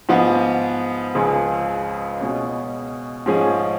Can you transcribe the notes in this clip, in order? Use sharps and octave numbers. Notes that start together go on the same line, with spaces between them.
G#2 F3 B3
C#2 C#3 F3 G#3
B2 G#3 C#4
G#2 F3 G#3 C#4 G#4